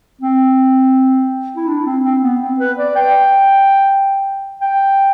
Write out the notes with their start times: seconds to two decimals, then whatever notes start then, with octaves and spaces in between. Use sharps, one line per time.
0.21 C4
1.56 E4
1.68 D4
1.85 C4
2.04 C4
2.23 B3
2.41 C4
2.59 B4
2.78 D5
2.96 G5
4.62 G5